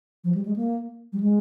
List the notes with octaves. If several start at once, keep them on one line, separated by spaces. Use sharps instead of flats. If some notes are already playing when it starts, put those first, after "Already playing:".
F3
G3
G#3
A#3
G3
G#3